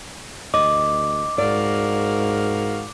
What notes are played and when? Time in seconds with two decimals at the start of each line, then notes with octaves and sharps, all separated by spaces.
0.54 D2 D#5 D6
1.38 G#2 F#4 A#4 D5 F5